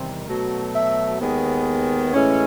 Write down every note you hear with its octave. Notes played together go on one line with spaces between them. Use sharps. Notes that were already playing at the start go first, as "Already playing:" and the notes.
Already playing: E2 C3 D#3 G3 C4
B2 F#3 A3
E5
D#2 D#3 G#3 B3
A2 E3 G#3 C#4